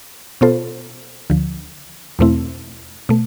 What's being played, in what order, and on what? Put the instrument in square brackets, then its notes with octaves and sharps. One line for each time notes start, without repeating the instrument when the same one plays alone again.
[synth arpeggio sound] B2 B3 F4 A4 C5
D2 D3 F3
E2 B2 A3 C4 E4
B2 A3